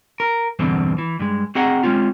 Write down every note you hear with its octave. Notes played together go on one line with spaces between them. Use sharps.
A#4
E2 G2 B2 D3 C4
E3
G2 G#3
C4 F#4 G#4 D#5 F#5 A#5
G#3 A#3 C4 C#4 F4